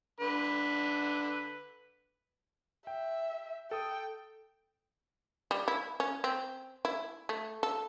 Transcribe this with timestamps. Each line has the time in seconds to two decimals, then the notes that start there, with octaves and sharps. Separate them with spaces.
0.20 D3 B4
2.87 E5 G5
3.71 A4 G5 D#6
5.51 G3
5.68 E4
6.00 C#4
6.24 C4
6.85 E4
7.29 A3
7.63 A4